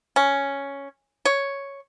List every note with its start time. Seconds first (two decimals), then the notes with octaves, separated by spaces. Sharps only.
0.16 C#4
1.25 C#5